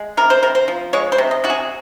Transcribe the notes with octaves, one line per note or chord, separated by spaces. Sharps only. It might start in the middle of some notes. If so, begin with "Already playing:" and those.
Already playing: G#3
C3 A#4
C5
C3 A#4
C5
F3
G#3 C#5
C5
C3
D#5
C3 F#4
G#4